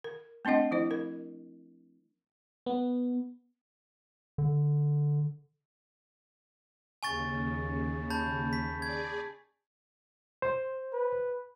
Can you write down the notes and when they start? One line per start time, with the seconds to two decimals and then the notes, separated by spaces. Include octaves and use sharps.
0.04 A#4
0.45 A3 C4 D4 D#5 F#5
0.71 F3 E4 C5
0.91 A#4
2.66 B3
4.38 D3
7.03 D#2 C#3 G#5 C#6 A6
8.10 A5 B5 G6
8.53 B6
8.82 G#4 D5 G#6
10.42 C5
10.93 B4